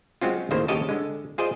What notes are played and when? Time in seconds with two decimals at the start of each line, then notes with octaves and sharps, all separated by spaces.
0.21 F#3 G#3 C4 C#4 F4
0.51 D#2 A2 C#3 A#3 C5
0.68 D#2 C#3 G4 C#5 D#5 A5
0.89 D3 G#3
1.38 F4 G#4 C5 D5 D#5